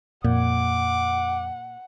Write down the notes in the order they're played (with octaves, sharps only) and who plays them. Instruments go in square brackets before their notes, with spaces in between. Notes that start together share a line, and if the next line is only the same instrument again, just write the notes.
[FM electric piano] F2 [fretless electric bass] A#2 [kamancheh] F#5 [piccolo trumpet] D6